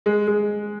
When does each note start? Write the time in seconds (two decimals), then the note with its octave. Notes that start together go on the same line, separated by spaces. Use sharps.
0.06 G#3
0.27 G#3